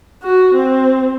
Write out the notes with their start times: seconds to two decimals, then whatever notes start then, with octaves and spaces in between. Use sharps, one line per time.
0.23 F#4
0.55 C4